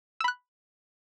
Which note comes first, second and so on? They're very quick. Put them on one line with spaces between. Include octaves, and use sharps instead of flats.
E6 B5 F#6